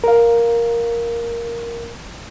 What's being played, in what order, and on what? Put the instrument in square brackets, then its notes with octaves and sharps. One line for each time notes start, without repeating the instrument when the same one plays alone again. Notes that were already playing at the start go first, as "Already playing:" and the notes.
[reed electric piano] A#4 F5